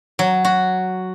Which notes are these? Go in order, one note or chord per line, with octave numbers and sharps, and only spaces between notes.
F#3
F#4